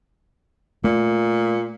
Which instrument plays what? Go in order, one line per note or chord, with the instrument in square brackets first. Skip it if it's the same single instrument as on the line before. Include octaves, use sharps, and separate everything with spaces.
[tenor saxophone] A#2 [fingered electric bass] A3